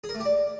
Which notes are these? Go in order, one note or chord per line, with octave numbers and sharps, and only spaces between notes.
G#4
A#4
A3
G4
D5